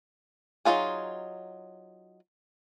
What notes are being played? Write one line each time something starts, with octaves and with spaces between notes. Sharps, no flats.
F#3 A3 D#4 F4 G#4